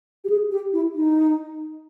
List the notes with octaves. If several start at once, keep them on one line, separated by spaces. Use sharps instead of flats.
G4
G#4
G4
E4
D#4